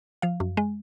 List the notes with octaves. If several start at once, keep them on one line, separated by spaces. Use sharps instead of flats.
F3 F5
F#2
G#3